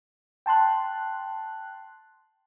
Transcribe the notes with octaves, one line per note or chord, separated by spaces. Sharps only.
G5 A5 C6 F#6